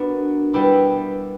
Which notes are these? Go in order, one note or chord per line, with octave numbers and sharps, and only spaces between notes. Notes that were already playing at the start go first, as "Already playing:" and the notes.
Already playing: B3 D4 F#4 A#4
G3 B3 E4 G4 B4